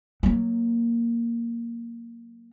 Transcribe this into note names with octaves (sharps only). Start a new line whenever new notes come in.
F#3 A#3